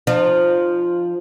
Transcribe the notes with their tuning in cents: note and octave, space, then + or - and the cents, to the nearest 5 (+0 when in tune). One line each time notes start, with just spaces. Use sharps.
F3 +0 D#4 -45